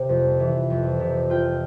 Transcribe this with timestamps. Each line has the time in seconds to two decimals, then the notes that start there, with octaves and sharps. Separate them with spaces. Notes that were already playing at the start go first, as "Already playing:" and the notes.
Already playing: C3
0.09 F2
0.40 E3
0.70 F2
1.00 C3
1.30 F4 G5